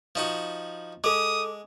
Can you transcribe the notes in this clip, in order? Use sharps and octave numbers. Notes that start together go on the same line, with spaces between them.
F3 D#4 F#4
G#3 A4 D6 D#6